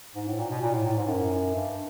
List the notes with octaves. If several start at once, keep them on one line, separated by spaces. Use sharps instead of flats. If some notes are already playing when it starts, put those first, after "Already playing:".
G#2
A2
A#2
B2
A#2
A2
A2
G#2
F#2
G2